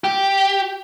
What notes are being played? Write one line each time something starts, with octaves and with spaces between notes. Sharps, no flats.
G4